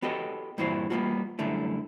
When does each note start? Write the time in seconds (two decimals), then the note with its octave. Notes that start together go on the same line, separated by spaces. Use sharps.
0.02 B3 F#4 G4 A4 D#5
0.58 G2 A#2 E3 E4 F#4 C5
0.90 G3 A#3 B3 C#4 F4 F#4
1.39 F#2 D3 G3 A3 E4